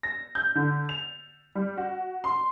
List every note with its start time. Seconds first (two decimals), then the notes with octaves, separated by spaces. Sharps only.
0.03 A#6
0.35 G6
0.55 D3
0.89 F7
1.55 G3
1.77 F#4
2.24 C6